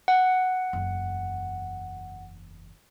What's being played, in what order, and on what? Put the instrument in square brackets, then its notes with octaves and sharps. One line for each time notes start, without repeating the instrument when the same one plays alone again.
[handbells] F#5
[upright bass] F#1 E2